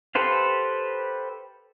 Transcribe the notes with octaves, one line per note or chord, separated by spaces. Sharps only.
G4 A4 B4 C5 F5